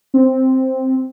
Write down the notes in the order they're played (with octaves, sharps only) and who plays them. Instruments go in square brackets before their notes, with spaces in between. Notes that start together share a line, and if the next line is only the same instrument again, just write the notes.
[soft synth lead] C4